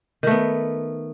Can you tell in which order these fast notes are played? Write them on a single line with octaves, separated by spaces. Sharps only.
D#3 A3 B3